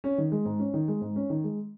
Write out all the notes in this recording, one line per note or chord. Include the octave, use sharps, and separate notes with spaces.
C#4
D#3
G#3
G#2
C#4
D#3
G#3
G#2
C#4
D#3
G#3